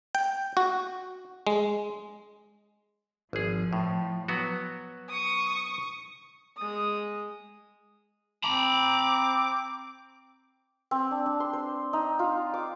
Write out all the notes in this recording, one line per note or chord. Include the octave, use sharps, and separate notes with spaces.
G5
F#4
G#3
G#1 F3 G#4
A2
F#3 B3 F#4
C#6 D#6
G#3 D#6
C4 A#5 B5 D6
C4
D4
D4
C6
C5
D#4
F4
D6